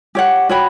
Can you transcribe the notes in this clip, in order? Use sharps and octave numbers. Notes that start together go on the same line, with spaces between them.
G4 C#5 F#5
F#4 C#5 G5 B5